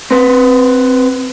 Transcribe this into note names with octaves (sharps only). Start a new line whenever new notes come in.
C4 B4 C6